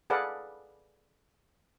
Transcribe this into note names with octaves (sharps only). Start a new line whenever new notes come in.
G#4 A4 B4 D5 F5 F#5